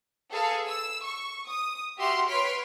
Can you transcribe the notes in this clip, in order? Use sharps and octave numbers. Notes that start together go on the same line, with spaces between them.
G#4 A4 B4 F5
E6
C#6
D#6
F#4 G4 E5 F#5 C6 F6
B4 C#5 C6 F6 B6 D7